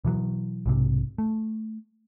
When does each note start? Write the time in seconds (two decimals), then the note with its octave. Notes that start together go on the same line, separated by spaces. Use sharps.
0.05 B2 E3 F#3
0.66 B1 G#2 C3
1.18 A3